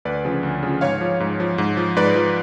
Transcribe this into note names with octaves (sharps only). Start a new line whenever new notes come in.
D2 B4 D5
C#3 F3
D2
C#3 F3
G#2 C#5 F5
F3
G#2
F3
G#2
F3
G#2 B4 D5
F3